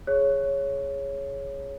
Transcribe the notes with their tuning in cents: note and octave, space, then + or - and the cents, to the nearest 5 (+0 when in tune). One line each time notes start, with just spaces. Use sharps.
G#4 +0 C#5 +0